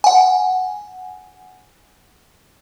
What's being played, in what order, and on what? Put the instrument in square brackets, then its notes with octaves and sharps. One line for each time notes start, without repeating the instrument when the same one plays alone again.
[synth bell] F#5 G#5